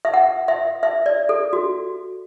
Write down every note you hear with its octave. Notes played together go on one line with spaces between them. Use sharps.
E5
F#5
E5
E5
D5
A4
F#4